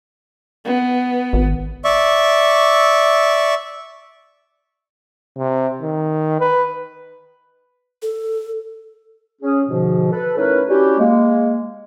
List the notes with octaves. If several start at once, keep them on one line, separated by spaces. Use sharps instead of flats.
B3
G#1
D5 E5 C#6
C3
D#3
B4
A4
C#4 G#4
G#2 B2 D3 F3
A4 B4
A3 C#4 D#4 E4 A#4 B4
C#4 D4 E4 F#4 G4
G#3 A#3